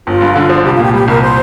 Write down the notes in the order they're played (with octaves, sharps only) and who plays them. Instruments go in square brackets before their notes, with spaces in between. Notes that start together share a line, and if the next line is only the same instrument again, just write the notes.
[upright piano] G1 [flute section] F4
[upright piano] G2
D3
F3
[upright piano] C2 [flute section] G4
[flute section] F4
[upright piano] A#2 [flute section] G4
[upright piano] G3 [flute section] G4
[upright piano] C2 [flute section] A#4
[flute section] C5